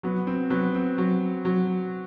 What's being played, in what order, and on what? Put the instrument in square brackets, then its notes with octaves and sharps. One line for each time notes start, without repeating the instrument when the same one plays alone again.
[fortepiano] F#3 [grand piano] B3
[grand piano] C4
[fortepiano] F#3 [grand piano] B3
[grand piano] C4
[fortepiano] F#3
F#3